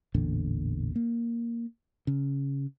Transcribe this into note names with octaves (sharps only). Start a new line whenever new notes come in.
A1 E2 A#2 D3
A#3
C#3